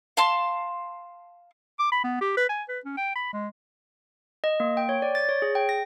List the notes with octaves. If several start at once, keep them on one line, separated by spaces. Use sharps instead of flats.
F5 A5 C6
D6
B5
B3
G4
B4
G#5
B4
C#4
G5
B5
G#3
D#5
A#3
G5
C#5
D5
A6
C#5
G#4
G5
A#6